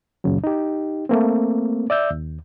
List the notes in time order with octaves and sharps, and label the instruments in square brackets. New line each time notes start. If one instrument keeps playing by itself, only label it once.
[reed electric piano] C#2 F#2 A#2 C#3 F#3
D#4 G4
A3 A#3 C4
D5 E5 E6 G6
D#2